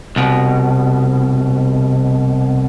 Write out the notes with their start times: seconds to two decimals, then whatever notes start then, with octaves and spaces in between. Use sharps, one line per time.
0.16 C2 B2